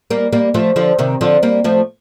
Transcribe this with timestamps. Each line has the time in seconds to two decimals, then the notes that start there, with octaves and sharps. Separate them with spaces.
0.11 G3 A#3
0.33 G3 A#3
0.54 F3 A3
0.76 D3 F3
0.99 C3 D#3
1.21 D3 F3
1.43 G3 A#3
1.64 F3 A3